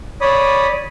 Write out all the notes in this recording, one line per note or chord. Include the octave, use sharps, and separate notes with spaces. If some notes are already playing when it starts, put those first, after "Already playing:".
C#5 D5 B5 D#6